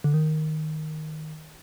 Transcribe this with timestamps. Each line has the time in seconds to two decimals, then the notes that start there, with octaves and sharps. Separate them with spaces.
0.04 D3
0.14 D#3